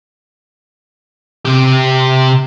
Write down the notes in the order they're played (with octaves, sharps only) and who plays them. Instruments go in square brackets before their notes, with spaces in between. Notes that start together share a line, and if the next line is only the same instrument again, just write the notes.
[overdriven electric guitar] C3 G4